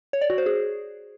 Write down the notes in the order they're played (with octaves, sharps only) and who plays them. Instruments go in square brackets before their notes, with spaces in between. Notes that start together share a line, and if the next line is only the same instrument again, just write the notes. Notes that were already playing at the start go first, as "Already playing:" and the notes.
[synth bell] C#5
D5
F#4
C5
G#4